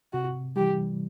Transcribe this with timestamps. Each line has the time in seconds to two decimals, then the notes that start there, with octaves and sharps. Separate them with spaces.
0.13 C3 F#4
0.56 E3 G3 G4